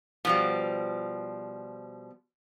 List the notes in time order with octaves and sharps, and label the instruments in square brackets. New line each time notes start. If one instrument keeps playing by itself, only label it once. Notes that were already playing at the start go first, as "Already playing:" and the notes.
[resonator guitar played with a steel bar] B2 F3 G3